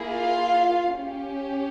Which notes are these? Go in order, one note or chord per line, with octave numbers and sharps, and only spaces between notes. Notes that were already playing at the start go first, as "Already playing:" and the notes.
Already playing: A#3 E4 G#4
F4 F5
C#4 G4